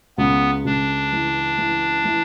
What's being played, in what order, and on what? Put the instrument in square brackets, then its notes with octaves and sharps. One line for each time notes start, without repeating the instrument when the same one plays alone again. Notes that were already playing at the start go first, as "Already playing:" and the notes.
[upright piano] C#2 [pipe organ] B3
[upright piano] C#2 [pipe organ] D4
[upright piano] E3
E3
E3